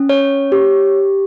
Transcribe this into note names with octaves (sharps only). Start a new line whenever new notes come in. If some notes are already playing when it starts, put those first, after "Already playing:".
Already playing: C#4
C#5
G4